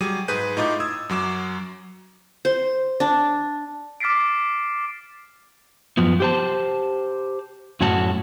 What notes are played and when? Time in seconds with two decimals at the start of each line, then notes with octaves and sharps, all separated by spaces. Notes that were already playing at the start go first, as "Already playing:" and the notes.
0.01 F#3 G3 G#4 D6 D#7
0.28 G#2 G#4 B4 G6 D#7
0.57 A2 D#4 F4 D#5 D6 A6
0.80 D#6 E6 G#6
1.09 F#2 F#3 D6 E7
2.45 C5
3.00 D4
4.00 D6 F6 A6 B6 C7 D7
5.97 F#2 F3 B3
6.20 G4 C5 A5
7.81 F#2 A2 A3 C#4 F#4 A5